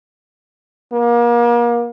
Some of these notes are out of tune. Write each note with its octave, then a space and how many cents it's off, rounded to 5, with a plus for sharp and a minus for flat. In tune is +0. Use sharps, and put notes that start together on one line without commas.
A#3 +35